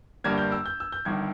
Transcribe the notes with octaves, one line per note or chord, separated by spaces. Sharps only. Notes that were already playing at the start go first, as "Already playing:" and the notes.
G1 G2 G3 A#3 G#6
G6
E6
G6
E6
G6
G1 G2 D#3 G#6